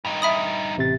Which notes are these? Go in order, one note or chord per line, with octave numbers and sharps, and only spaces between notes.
G2 D#4
E5 B5 D#6
A1 C3 A6